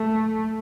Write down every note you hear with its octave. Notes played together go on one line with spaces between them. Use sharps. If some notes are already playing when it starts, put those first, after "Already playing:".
Already playing: A3